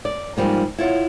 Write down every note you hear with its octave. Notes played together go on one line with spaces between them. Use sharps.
D5
G#2 F3 G3 A#3
E4 F4 C#5 F#5